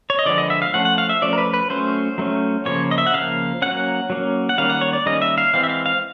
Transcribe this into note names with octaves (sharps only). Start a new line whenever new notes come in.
C#5
D#5
D3 F3 G#3 B3 D5
D#5
E5
F5
F3 A3 C#4 F#5
F#5
F5
E5
F3 A3 C#4 D5
A#4
B4
B4
F#3 A3 C#4 C5
F#3 A3 C#4
C#3 F3 A#3 C#5
D#5
E5
F#5
C#3 F3 A#3 F5
F#3 A#3 C#4 F#5
F#3 A#3 C#4
F#5
D#3 G3 A#3 C#4 F5
F#5
C#5
D5
D#3 G3 A#3 C#4 D#5
E5
F5
E3 G#3 C4 F5
E5
F5
F5